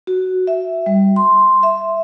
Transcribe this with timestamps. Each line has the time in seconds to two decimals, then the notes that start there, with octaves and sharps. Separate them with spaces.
0.07 F#4
0.47 E5
0.86 G3
1.16 C6
1.63 E5